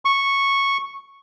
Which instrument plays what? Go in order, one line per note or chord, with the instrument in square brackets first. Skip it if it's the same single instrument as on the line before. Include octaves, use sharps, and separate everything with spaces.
[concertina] C#6